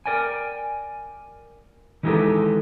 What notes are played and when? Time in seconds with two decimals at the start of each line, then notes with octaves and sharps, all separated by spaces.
0.06 A#4 D5 G5 G#5
2.03 D#3 E3 G#3 D#4 G4 A4